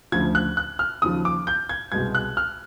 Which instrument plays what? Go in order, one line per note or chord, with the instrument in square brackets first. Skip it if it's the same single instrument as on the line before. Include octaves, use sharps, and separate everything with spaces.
[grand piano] D2 C#3 F3 G#6
F#6
F#6
F6
D#2 C#3 F3 D#6
D6
G6
G#6
C2 B2 G#3 G#6
F#6
F6